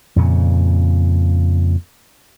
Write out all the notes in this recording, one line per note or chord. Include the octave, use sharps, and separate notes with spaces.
F2 A#2 C#3